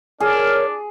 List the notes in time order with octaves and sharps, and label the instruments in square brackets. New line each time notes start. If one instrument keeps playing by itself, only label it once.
[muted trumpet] D4 [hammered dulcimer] G#4 [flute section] A#4 C#5 F6